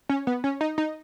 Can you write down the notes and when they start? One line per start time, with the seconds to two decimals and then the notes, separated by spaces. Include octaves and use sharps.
0.09 C#4
0.27 B3
0.44 C#4
0.61 D#4
0.78 D#4